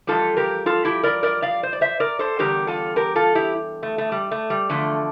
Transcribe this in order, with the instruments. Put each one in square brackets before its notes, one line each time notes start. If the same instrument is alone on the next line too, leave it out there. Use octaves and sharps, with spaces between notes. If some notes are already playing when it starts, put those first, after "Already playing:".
[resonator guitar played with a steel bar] F2 E3 G3 F4 A4
G4 A#4
F4 A4
E4 G4
A#4 D5
A#4 D5
D5 F5
C5
D5
C5 E5
A#4 D5
A4 C5
E2 D3 G3 G4 A#4
F4 A4
G4 A#4
F4 A4
E4 G4
A3
A3
G3
A3
G3
E2 D3 F3 A3